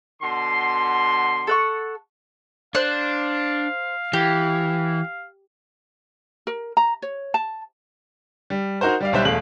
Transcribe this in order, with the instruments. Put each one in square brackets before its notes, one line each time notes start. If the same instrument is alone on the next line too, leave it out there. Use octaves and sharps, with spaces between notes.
[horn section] B2 D3 C6
[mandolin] A4 F#5 C#6
[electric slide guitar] D4 [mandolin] C5 F#6 [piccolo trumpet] F5
[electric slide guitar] E3 [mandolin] G4
[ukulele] A#4
A#5
C#5
A5
[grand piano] G3
D#4 F#4 A#4 C5
G3 D5 F5
B1 G3 C5 E5 F#6
E1 A3 F5 F#7